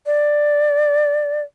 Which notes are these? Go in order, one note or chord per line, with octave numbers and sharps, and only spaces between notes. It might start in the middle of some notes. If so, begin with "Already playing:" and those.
D5